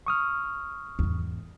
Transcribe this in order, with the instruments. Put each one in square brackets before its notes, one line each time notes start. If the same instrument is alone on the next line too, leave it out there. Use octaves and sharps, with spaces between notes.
[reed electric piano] C#6 D#6 F6
[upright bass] E2 G#2